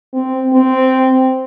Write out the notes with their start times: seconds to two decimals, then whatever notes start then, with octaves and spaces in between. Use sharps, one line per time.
0.14 C4
0.53 C4